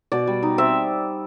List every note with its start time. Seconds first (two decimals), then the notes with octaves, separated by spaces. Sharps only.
0.12 B2 D5
0.27 G3
0.43 D#4
0.58 C4 E5